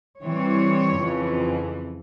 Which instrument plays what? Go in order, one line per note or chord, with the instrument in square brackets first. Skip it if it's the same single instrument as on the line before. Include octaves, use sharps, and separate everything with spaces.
[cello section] E3 G3 C4 C#5
F2 C#3 E3